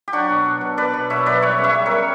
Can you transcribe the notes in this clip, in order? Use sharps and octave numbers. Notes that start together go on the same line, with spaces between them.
G4
F#3 D4 F#4
B2
F#3
B2
B2 B4 D5
B2
B2 C#5 E5
F#3 B4 D5
G3 C#5 E5
C#3
C#5 E5
G3
A#4 C#5
G3